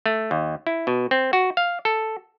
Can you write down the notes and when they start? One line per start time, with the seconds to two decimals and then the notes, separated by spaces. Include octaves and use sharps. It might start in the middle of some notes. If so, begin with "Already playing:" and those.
0.06 A3
0.31 D#2
0.67 E4
0.87 B2
1.11 C4
1.33 F#4
1.57 F5
1.85 A4